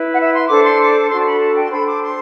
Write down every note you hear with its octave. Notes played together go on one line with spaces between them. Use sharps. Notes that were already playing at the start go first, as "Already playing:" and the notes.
Already playing: E4 B4
F#5
E5
C6
D4 A4 C5 D6
C6
D6
D4 F#4 A4 C6
A5
B5
A5
G5
C6
D4 A4 C5 B5
D6
C6